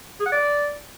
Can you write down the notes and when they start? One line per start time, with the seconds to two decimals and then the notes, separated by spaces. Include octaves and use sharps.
0.20 G#4
0.26 F#5
0.32 D5